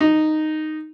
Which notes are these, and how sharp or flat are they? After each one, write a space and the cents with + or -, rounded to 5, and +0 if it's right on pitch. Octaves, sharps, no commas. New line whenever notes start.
D#4 -5